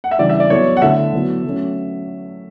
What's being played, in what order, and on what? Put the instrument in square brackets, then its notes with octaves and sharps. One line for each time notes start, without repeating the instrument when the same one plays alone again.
[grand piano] F#5
E5
[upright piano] C#3 E3 G3 D4 [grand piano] D5
[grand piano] E5
D5
[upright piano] F#3 B3 E4 A4 [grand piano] C#5
[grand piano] F#5
[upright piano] D3 A3 E4 A4 [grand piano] E5
[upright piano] F#3 B3 E4
F#3 A3 C#4